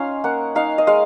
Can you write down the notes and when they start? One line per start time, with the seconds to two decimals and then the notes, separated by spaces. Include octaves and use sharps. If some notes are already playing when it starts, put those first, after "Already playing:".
Already playing: C#4 D#4 F4 F5
0.24 A#3 F#5
0.55 D#4 F5
0.78 D#5
0.87 G#3 F5